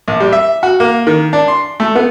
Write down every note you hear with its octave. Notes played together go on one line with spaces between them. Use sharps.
A#1
G3
E5
F#4
A#3
D#3
D4
C6
A3
B3